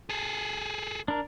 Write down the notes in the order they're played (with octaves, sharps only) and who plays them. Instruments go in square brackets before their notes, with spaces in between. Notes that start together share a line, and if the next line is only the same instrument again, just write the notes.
[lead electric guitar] G#4 A4
[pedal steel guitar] D4 A#4